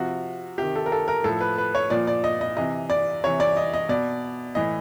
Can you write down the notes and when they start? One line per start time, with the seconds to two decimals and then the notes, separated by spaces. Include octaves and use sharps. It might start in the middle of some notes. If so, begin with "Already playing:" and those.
Already playing: C3 F3 F#4
0.58 C3 D#3 G4
0.76 A4
0.86 A#4
0.92 A4
1.08 A#4
1.24 A2 F3 A4
1.41 B4
1.58 B4
1.75 C#5
1.90 A#2 F3 D5
2.07 D5
2.24 D#5
2.41 D#5
2.57 C3 E3 D#5
2.90 D5
3.24 C3 E3 C#5
3.40 D5
3.57 D#5
3.74 D#5
3.89 B2 D5
4.55 A2 E3 D#5